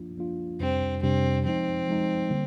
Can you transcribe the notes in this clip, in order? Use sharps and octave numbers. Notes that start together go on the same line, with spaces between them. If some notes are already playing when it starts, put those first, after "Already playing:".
Already playing: F3 A#3 D4 F4
F3 A#3 D4 F4
F2 C3 G3 C4 D4 G4
F2 C3 G3 C4 D4 G4
F3 G#3 C4 D#4
F3 G#3 D#4
D3 G3 A#3